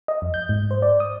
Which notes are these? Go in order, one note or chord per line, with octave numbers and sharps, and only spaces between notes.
D#5
F2
G6
G#2
C5
D5
D#6